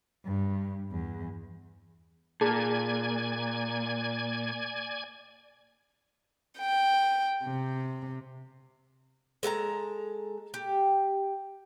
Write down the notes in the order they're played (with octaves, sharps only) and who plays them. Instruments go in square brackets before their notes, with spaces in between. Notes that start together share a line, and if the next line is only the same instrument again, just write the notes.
[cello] G2
E2
[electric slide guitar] A#2 [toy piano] D#4 G#4 A5 [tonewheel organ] D5 G#5 G#6
[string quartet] G5
C3
[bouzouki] G#3 A4 F5 A#5
G4